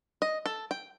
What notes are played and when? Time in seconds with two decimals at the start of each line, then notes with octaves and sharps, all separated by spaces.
0.22 D#5
0.46 A4
0.71 G5